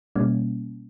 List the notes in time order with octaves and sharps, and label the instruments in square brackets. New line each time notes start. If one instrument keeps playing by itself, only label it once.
[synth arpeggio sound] B2 G3 A#3 C#4